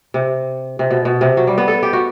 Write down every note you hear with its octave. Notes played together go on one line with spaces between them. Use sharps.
C3
C3
B2
B2
C3
F#3
G3
B3
A4
G4
F#4